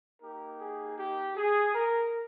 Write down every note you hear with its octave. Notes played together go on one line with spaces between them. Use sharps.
A#3 D#4 G4 A#4
G#4
G4
G#4
A#4